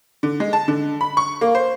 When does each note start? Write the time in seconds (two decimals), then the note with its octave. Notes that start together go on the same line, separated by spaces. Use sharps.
0.23 D3
0.40 G#3
0.53 A5
0.68 D3
1.01 B5
1.17 C#6
1.41 A#3
1.55 C5